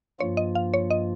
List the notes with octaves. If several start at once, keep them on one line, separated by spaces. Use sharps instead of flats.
G2 F3 A#3 F4 C#5
D#5
F5
C#5
D#5